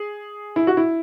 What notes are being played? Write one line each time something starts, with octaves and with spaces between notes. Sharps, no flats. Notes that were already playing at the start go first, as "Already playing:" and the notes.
Already playing: G#4
E4
F#4
E4